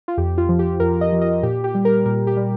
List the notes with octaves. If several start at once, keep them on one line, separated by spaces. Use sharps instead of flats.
F4
F2 G4
F4
F3
G4
F2 A#4
D#5
F3
D#5
A#2 G4
G4
G3
A#4
A#2 A#4
G4
G3